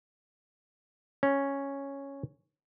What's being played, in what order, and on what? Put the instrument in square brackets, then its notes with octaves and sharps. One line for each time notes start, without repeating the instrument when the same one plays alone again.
[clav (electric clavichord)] C#4